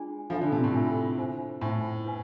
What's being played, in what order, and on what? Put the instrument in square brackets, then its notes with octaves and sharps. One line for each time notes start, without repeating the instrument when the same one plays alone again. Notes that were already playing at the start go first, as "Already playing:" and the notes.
Already playing: [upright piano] G#3 [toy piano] D4 F4 G#4 D5
[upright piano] F3 [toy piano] D4 F4 A4 E5 B5
[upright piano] D3
C3
A2
[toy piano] D4 F4 A4 E5 B5
C5 E5 G#5
[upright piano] A2 [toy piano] C5 E5 G#5
[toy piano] E4 B4 F5 G#5